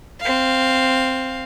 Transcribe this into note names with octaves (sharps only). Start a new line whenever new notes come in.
C4 F5